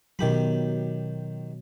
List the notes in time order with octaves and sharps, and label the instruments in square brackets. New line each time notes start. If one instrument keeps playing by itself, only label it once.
[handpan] B2 F#3 [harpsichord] D#3 G4 B5